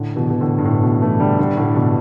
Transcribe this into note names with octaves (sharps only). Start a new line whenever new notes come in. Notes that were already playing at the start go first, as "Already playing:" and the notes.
Already playing: A2 D3
B2 E3
B2
A2 D3
G2
A2
G2 B2
E3 A3
D3 G3
D3 G3
A2 D3
G2 B2